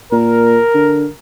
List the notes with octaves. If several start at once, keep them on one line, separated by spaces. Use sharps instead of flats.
A#2 A#4
D3